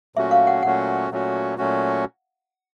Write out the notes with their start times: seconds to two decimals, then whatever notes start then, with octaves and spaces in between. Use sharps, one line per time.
0.16 A#2 F#3 A3 C#4 F#4 E5
0.31 F5
0.47 F#5
0.63 A#2 F#3 A3 C#4 F#4 F#5
1.11 A#2 F#3 A3 C#4 F#4
1.58 A#2 F#3 A3 C#4 F#4